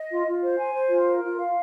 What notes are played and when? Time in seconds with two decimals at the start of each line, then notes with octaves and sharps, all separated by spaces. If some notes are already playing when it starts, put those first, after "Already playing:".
Already playing: D#5
0.10 F4
0.26 F4
0.42 C5
0.58 G#5
0.74 C5
0.90 F4
1.06 A#4
1.23 F4
1.39 F5